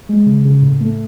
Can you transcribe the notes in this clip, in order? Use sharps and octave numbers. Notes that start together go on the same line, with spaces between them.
G#3
C#3
C#3
A2
A3